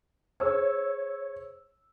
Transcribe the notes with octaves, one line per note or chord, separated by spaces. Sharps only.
G#4 C5 C#5 E6